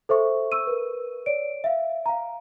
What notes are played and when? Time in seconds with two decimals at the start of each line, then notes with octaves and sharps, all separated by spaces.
0.09 A4 C5 E5 C#6
0.52 C#6 E6 D#7
0.67 A#4 B4
1.26 C#5 D5 D7
1.64 E5 F5
2.06 F5 A#5